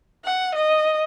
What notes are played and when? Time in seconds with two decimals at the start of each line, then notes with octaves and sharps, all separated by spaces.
0.25 F#5
0.55 D#5